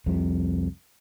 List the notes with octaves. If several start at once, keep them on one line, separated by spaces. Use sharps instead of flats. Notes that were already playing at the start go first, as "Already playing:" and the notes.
C2 F2 C3